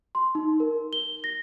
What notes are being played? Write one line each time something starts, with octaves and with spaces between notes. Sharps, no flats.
C6
D#4
A#4
G7
A#6